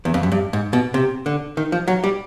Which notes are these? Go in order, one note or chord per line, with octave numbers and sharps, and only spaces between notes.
E2
F2
F#2
G2
G#2
B2
C3
D3
D#3
F3
F#3
G3